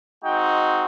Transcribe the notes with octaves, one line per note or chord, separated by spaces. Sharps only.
G#3 C4 D#4 F#4 G5